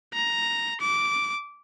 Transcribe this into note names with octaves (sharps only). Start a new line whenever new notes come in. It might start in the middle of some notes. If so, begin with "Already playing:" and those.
A#5
D6